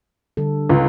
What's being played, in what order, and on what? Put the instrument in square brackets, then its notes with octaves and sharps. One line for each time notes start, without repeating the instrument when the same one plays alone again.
[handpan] D3 G3 A4
[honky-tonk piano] C#2 [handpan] B4